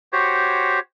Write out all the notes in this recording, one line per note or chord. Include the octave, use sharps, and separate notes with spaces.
F#4 G4 C5 C#5